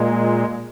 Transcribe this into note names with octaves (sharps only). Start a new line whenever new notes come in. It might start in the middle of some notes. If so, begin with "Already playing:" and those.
Already playing: A#2 G#3